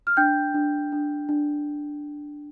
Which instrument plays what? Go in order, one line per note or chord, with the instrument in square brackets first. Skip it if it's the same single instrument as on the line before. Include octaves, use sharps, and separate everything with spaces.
[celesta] F6
D4 G5 G6
D4
D4
D4